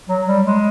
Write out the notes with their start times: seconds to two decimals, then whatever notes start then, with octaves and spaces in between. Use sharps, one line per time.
0.09 F#3
0.27 G3
0.45 G#3